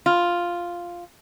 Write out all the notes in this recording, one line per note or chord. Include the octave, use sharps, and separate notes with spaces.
F4